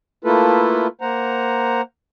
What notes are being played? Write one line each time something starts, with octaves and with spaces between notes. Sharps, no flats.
A3 A#3 E4 F4 A4 B4
A#3 C5 F#5 A#5